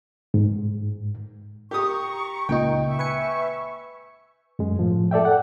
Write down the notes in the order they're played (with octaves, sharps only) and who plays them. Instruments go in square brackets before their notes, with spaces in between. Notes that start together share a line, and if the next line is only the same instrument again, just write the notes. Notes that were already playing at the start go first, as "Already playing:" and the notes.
[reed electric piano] G#2
[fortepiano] G4 D#6 [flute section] A#5 C#6
[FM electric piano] C#2 A#2 D#4 [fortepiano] G5
[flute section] E5 C#6
[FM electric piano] B4 G#5 C#7
[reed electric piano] F#2 G#3
A2 F3
A4 D5 E5 G5
F#5